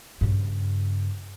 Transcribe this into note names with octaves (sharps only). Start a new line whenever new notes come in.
G2 C#3